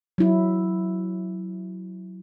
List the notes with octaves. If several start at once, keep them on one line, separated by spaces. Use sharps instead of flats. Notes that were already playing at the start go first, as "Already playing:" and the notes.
F#3 E4